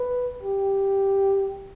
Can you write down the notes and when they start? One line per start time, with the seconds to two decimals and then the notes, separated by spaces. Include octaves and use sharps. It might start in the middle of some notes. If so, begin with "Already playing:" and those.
Already playing: B4
0.44 G4